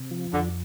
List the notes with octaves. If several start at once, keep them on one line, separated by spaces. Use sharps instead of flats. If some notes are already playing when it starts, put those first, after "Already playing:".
Already playing: C3
F3
F2 D3